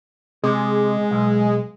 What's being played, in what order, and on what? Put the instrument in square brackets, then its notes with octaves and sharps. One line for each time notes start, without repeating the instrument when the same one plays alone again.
[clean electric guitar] C3 [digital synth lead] G#3
[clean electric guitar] B1